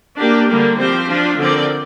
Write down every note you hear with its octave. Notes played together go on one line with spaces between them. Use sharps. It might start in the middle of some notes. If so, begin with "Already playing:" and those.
A#3 D4 G4
D3 G3 A#3
F3 C4 G4 C5
F3 D4 F4
D3 F3 C4 A#4 D5